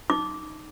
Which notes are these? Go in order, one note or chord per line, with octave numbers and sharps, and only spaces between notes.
D#4 D6